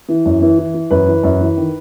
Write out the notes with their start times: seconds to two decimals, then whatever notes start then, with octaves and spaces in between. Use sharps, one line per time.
0.09 E3
0.26 F#2
0.42 E3
0.58 E3
0.74 E3
0.91 F#2 B4
1.07 E3
1.23 F#2
1.41 E3
1.57 D#3